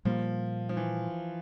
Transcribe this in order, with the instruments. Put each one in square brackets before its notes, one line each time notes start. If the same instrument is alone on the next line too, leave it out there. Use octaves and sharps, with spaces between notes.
[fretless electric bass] A#2 G3 A#3 [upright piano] F3
[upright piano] F3
E3